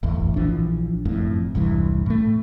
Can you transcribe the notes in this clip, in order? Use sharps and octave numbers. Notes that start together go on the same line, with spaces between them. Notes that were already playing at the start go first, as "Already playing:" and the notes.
D1 G1 E2 A2
A#1 E3 F3 D4
F#1 F2 A2
E1 C2 G2 E3
A2 A3